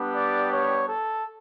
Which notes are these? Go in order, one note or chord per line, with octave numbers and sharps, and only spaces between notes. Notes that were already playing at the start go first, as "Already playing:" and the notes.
Already playing: G3 B3 D4 G4
D5
C#5
A4